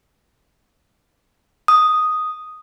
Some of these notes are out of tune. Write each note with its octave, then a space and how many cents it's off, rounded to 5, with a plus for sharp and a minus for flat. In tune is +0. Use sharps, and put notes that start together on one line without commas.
D#6 +0